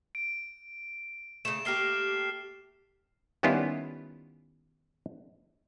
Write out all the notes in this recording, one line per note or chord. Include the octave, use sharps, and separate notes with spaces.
D7
C#3 A3 E7
A3 A#3 G4 F6 C7 G7
D#3 G3 B3 C#4 E4 F4